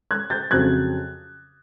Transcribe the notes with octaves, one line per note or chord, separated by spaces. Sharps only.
F#6 G#6
G6 A6
F2 C#3 F#3 F#6 G#6